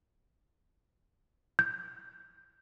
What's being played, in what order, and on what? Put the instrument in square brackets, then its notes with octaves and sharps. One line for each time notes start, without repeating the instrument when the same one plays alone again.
[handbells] G6